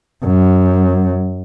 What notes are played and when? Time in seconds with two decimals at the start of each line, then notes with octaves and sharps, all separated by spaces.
0.24 F#2